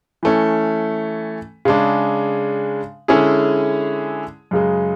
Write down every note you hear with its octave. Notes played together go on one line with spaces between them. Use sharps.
E3 A3 C#4
C#3 G#3 D4
D3 G#3 C#4 E4 G#4
F#2 C#3 G#3